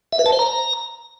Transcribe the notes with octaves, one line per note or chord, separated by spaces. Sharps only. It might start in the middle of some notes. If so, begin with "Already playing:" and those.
E5
B4
A5
C5
A#5